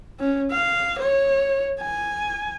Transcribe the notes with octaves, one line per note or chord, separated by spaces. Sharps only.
C#4
F5
C#5
G#5